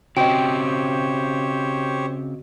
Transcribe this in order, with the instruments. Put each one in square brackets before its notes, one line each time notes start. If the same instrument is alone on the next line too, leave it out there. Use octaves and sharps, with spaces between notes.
[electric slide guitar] C#3 C4 [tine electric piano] F#4 D#5 [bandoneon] G4 C5 C#5 [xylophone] G5